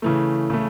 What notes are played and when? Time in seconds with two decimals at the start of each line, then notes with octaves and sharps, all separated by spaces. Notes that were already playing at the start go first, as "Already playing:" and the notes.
0.02 C#3 E3 A3
0.50 C#3 E3 A3